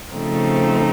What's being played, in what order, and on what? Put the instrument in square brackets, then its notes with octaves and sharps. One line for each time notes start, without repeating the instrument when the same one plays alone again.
[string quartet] C#3 F3 A3 C4 D#4